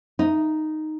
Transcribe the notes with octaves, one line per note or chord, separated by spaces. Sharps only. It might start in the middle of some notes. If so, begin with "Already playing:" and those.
D#4